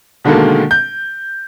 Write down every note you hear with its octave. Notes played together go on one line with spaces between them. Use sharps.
B2 D3 D#3 G#3 A#3 A4
G6